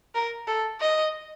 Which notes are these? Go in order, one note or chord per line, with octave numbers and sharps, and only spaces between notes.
A#4
A4
D#5